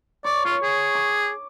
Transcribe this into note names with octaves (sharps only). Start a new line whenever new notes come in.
C#5 D5
F4 C#5
G#4
D6